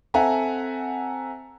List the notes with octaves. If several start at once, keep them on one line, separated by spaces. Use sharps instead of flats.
C4 A4 E5 F#5 G#5 A#5